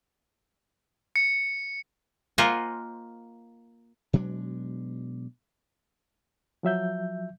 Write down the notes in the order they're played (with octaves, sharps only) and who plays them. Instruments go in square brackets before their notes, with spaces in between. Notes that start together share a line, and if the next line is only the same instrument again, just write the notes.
[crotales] C#7
[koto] A#3 F4 C5 D#5 F#5 G#5
[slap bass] B2 F#3 G#3 D4
[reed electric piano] F3 F#3 E5 G6